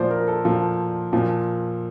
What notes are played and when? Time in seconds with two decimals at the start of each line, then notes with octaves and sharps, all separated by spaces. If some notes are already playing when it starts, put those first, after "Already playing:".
Already playing: A#2 F3 C5 D5
0.11 A#4
0.28 A4
0.45 A#2 F3 A4
1.13 A#2 F3